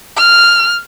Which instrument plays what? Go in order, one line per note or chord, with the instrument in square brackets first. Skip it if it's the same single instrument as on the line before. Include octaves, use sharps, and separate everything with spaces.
[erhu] F6